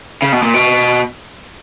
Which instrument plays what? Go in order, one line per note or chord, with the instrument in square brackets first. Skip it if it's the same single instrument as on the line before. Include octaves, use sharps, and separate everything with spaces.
[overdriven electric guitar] C#3
B2
A#2
B2